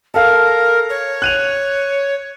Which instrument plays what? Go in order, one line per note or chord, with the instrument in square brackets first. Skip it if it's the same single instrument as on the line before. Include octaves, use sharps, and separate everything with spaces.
[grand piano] A4 F5 [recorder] A#4
[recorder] C#5
[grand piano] F#6 D#7 F7